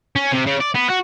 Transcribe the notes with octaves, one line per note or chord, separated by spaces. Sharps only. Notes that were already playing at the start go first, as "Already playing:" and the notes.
C#4
C3
C#3
D5
B3
F#4